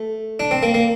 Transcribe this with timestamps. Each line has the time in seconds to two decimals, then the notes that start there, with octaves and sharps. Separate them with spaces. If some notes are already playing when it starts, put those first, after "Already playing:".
Already playing: A3
0.40 D4
0.51 C4
0.63 A#3
0.74 A#3